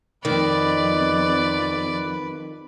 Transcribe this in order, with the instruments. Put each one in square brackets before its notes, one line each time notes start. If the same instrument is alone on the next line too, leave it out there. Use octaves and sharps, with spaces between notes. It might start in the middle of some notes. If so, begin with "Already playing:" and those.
[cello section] F2 [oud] D#3 [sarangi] B4 [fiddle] D5